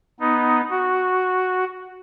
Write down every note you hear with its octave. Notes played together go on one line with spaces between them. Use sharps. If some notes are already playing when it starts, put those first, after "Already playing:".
B3 D#4
F#4